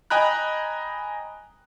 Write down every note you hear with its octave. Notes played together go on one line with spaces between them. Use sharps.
D#5 G5 G#5 A#5 B5 F#6